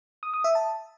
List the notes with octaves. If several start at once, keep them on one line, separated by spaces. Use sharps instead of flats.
D#6
D#6
E5
A5